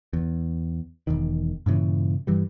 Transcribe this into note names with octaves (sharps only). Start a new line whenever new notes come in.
E2
E1 E2 D#3
G2 A#2 C#3 E3
G2 E3 G3